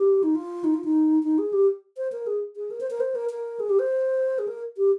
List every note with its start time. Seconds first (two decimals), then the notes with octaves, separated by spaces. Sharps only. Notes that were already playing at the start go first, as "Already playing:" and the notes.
Already playing: G4
0.23 D#4
0.35 F4
0.64 D#4
0.74 F4
0.84 D#4
1.23 D#4
1.38 G#4
1.53 G4
1.97 C5
2.12 A#4
2.27 G#4
2.56 G#4
2.71 A#4
2.81 C5
2.90 A#4
3.00 C5
3.15 A#4
3.30 A#4
3.60 G#4
3.69 G4
3.79 C5
4.39 G#4
4.48 A#4
4.77 G4